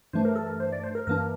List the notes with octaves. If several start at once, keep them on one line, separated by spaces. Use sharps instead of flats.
G2 E3 A3 D4 C5
A#4
A4
A#4
C5
D5
C5
A#4
G2 E3 A#3 D4 A#4